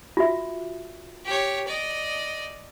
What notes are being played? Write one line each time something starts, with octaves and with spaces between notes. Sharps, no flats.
F4 F#4 E5
G4 C#5
D5 D#5